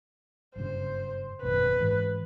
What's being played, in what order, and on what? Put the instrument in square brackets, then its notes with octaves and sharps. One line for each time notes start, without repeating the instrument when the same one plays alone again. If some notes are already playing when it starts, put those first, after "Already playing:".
[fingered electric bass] F#1 G2 C#3 [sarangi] C5
[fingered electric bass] G#1 F#2 B2 [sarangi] B4
[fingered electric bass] G#2 E3